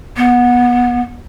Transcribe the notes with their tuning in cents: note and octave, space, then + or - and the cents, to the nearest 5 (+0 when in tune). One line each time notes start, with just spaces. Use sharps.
B3 -20